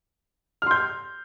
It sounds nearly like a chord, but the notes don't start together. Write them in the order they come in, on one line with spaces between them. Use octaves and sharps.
F6 C6 G6